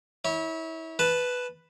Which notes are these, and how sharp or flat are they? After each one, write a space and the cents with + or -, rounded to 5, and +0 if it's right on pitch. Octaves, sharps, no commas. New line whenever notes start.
E4 -30 C#5 +0
B4 +0 A5 -5